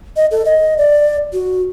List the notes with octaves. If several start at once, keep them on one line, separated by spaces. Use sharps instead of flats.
D#5
A4
D#5
D5
F#4